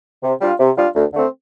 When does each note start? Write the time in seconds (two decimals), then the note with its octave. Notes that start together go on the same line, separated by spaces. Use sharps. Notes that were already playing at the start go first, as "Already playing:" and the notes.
0.23 C3
0.41 G3 D4 F4
0.60 C3
0.78 G3 D4 F4
0.95 D2
1.14 D3 A3 C4